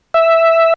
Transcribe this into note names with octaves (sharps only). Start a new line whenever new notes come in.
E5